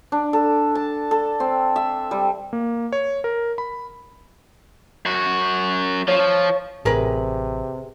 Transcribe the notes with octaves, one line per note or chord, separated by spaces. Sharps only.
D4
A4
A5
A4
C4
E5
G3
A#3
C#5
A#4
B5
F#2 F#4
F3 C#5 A5
F3
A1 C3 G#4 A#4 B4 A#5 B5